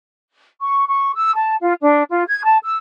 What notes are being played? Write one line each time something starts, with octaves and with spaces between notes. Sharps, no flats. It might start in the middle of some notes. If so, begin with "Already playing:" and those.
C#6
C#6
E6
A5
F4
D4
F4
G#6
A5
E6